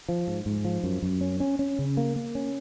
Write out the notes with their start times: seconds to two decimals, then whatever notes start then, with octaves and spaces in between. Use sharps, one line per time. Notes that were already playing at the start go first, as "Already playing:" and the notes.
0.09 F3
0.27 G#2
0.46 G#2
0.65 F3
0.84 F#2
1.03 F#2
1.21 C#4
1.40 C#4
1.59 C#4
1.79 C#3
1.97 A#3
2.16 A#3
2.35 C#4